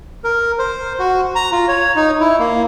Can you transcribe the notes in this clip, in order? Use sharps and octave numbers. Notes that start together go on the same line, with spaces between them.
A#4
C5
F#4
A#5
F4
C#5
D#4
E4
A#3